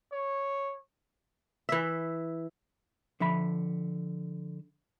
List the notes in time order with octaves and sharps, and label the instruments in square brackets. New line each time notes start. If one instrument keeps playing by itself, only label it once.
[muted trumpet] C#5
[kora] E3 E5
[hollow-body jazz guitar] D3 F3 E5 B5